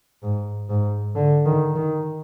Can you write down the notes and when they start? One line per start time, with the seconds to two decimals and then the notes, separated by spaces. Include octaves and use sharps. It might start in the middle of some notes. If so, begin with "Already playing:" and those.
0.23 G#2
0.69 G#2
1.16 D3
1.46 D#3
1.76 D#3